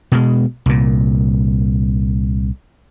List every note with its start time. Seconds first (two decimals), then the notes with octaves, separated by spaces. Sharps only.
0.12 B2 G#3
0.66 C2 A#2